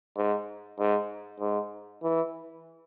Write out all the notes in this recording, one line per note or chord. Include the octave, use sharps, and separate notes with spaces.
G#2
G#2
G#2
E3